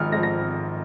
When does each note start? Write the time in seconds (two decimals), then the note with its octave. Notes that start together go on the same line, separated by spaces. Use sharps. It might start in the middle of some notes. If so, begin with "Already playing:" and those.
Already playing: G#1 G#2 F3 F6
0.12 G#2 F3 A#6
0.23 A#6